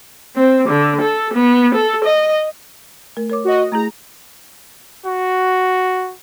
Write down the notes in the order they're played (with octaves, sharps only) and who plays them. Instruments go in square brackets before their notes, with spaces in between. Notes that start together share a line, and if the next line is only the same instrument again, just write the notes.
[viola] C4
D3
A4
B3
A4
D#5
[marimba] A3 A#4
A#4 C#5 D6
[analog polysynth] F#4 D#5
[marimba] A3 E4 G#4 [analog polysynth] A#5
[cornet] F#4